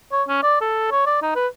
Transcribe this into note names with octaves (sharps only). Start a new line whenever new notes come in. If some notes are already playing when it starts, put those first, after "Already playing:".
C#5
C#4
D5
A4
C#5
D5
D#4
B4